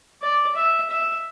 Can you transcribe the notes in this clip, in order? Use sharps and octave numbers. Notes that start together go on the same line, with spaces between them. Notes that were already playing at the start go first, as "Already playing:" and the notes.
D5
E5
E5